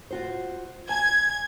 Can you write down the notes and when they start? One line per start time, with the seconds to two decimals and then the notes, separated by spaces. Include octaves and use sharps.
0.11 F4 F#4 C5
0.89 G#5 A5 G#6